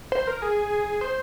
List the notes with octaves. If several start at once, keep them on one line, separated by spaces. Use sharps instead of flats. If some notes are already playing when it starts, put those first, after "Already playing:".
C5
A#4
G#4
C5